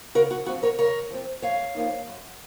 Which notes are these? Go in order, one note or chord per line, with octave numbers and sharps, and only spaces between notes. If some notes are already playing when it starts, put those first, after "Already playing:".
C#3 F#4 A#4
F#4
F3 C4 F#4
A#4 C#5
C#3 A#4 C#5
F3 C4
F#2 C#5 F5
F3 A#3 D#4
F#2